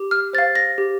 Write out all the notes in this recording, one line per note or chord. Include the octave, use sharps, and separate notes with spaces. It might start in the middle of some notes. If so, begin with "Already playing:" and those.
Already playing: G4
F6
C5 A6
F5
A#6
G4